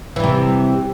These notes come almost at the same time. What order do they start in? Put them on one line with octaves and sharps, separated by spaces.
E3 G3 C3